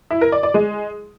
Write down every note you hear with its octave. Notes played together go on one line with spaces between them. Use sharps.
E4
A#4
D5
D5
G#3